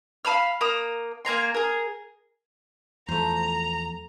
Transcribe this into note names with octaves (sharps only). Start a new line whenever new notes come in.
F5 A5 B5 F6
A#3 A#5 D#6
A#3 G#5 A#5 C6
G#4 A#4
E2 F3 A3 C5 A#5